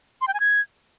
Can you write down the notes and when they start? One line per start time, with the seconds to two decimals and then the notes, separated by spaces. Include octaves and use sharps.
0.21 C6
0.28 G5
0.34 G#5
0.40 G#6